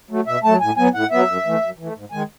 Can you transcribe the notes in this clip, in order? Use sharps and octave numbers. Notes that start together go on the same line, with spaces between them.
F#3 A3
B2 E5
F#3 A3 A5
A2 G#5
F#3 B3 G#5
A2 F#5
F#3 B3 E5
F#2
E3 A3
F#2
E3 A3
G#2
D#3 G#3 G#5